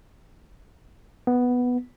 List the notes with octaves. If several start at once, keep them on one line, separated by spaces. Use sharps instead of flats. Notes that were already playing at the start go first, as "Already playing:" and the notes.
B3